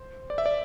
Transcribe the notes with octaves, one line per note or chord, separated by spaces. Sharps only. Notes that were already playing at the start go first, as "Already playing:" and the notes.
Already playing: C5
D5
E5
D5